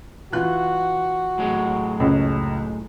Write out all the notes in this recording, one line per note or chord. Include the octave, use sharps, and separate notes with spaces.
E3 F4 F#4 F#6
A2 F#3 G#3
F#1 C#2